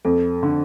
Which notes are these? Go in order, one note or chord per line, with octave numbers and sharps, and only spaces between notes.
F2 A4
D3